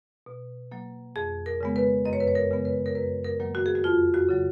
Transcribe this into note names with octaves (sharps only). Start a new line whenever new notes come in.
B2
F#3 A#3
F2 G#4
A#4
C#3 G#3 B3
B4
F#2 D#5
C#5
B4
C#5
A#4
C#3 G#3 B3
B4
A#4
F#2 B4
A#4
D#3 F#3 A#3
F#4
G#4
F#4
F2 F4
F#4
C#3 F#3